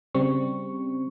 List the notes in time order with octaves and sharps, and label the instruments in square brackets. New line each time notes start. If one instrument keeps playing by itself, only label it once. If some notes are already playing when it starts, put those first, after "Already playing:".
[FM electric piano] C#3 G3 C4 C#6